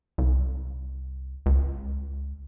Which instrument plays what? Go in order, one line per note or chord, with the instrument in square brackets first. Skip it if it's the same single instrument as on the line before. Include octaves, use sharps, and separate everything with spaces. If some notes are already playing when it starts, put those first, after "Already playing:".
[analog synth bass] C2
C#2